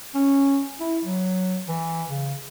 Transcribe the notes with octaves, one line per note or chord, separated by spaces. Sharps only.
C#4
E4
F#3
E3
C#3